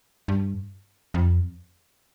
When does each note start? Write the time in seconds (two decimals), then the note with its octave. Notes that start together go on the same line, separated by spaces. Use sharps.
0.28 G2
1.14 F2